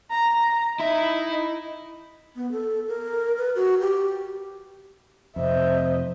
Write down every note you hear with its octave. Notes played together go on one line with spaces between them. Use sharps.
A#5
D#4 E4 E5
B3
A4
A#4
B4
F#4
G4
F2 C3 C5 D#5 E5